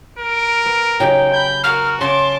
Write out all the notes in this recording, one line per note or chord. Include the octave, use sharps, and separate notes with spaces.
A#4 D7
B3
C#3 F#3 D#4 G4 G5
B5 G6
F#4 A#4 F6
C#3 A5 C6 D6